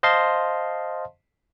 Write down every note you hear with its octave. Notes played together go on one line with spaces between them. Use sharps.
C5 D#5 F5 A5 C6